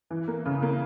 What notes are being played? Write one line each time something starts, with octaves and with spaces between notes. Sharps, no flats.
E3
A#3
C#3
A#3